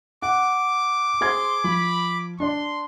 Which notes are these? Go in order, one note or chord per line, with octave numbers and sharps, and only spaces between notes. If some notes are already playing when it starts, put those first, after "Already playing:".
F#5 D6
G#4 C5 C6 G#6
F3 B5
D4 D5 C6